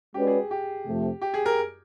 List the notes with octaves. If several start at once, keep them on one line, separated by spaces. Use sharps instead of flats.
G#3 C#4 F#4 G4 B4 D5
G#4
G4
F2 C3 F3 A3
G4
G#4
A#4